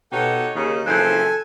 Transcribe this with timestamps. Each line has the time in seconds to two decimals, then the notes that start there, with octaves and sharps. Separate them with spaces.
0.12 B2 D#4 G4 A4 C#5 F#5
0.55 D#2 C#3 D#4
0.86 F#1 E3 F3 C4 A4 G#5 F#6 G6